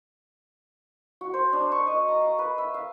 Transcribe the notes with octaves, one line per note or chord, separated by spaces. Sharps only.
F#4
C5
D4
C#6
D#5
A#5
F5
B4
E5
F5